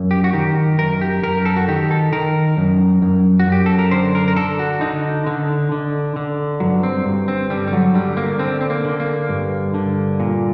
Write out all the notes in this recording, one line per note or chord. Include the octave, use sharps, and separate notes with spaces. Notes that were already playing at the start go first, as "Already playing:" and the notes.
Already playing: F#2
G4
F#4
D#3 G4
F#2 A#4
G4
F#2 A#4
A4
F#4
D#3 G4
A4
D#3 A#4
F#2
F#2
F#4
F#2
G4
A4
A#4
D3 C5
A#4
A#4
D3 A4
F#4
D3 D#4
D3
D3
D3
G2 F#3
C4
G2
C4
D3 G3
G3
F#3
D3 G3
A#3
D3 C4
C4
A#3
D3
A#3
G2
D3
A#2